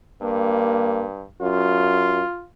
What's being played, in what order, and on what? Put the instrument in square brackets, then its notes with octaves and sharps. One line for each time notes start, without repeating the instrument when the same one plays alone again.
[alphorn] G2 [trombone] A#3
[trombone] F#2 [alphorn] F4